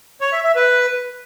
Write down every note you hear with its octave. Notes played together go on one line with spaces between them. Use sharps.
C#5
E5
E5
B4